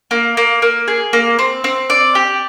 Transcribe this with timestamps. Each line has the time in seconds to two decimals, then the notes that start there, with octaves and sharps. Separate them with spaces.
0.11 A#3
0.37 A#3
0.62 A#3
0.88 G#4
1.13 A#3
1.39 C4
1.64 C4
1.90 D5
2.15 G4